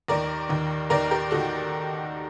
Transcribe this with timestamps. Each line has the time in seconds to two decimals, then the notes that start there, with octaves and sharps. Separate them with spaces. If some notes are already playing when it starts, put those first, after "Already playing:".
0.08 D#2 D#3 A#4 D5
0.49 D#2 D#3
0.90 D#2 D#3 A#4 D5
1.11 G4 A#4
1.31 D#3 F#4 A4